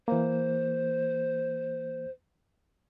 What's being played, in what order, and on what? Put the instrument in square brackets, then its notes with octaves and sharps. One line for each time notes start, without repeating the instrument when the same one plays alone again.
[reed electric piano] E3 A#3 [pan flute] C5